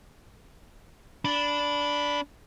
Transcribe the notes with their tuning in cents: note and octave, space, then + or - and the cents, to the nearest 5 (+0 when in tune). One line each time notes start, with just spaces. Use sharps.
D4 -10 B5 +0